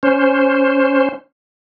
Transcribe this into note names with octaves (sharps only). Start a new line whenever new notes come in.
C#4 C5